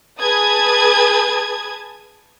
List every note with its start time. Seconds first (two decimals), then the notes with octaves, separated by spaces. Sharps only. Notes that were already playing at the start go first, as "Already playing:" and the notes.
0.21 G#4 B4 A5 D#6 G#6